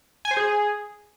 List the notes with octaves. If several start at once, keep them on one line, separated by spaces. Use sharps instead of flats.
G#5
C5
G#4